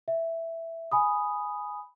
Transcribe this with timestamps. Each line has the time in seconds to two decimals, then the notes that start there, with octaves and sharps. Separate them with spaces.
0.08 E5
0.92 G#5 B5 D#6